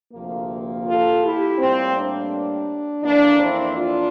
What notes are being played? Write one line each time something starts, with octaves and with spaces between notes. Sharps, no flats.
D2 C3 F3 A#3
F4 A4
E4 G4
A2 G3 A#3 C4
D4
F2 E3 A#3 D4
C4 E4
D4 F4